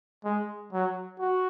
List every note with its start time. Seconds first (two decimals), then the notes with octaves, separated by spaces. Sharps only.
0.25 G#3
0.73 F#3
1.19 F#4